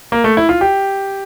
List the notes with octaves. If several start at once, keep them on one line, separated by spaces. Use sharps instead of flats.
A#3
A3
E4
F4
G4